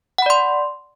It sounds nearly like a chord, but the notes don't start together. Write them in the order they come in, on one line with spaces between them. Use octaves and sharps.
F#5 B5 D5 C6